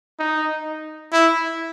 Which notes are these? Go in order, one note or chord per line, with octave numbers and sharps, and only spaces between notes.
D#4
E4